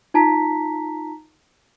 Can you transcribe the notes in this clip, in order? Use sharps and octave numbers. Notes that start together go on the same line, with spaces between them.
D#4 F4 A5 A#5 B6